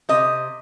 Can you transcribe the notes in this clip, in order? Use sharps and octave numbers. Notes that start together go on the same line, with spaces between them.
C3 D#5